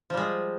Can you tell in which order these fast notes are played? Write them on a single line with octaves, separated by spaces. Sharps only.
F3 G3 G#3